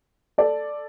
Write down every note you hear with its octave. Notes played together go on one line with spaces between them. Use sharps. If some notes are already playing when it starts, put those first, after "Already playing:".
A4 D5